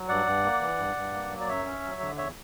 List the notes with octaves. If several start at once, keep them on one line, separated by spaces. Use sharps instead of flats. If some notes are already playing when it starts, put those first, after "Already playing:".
Already playing: F#3
G2 D5 F#5
G2
A#3
E3
G2
G2
A#3
F#3
D5
F#2 C#5 E5
C#4
F#3
D3
E2 C#5 E5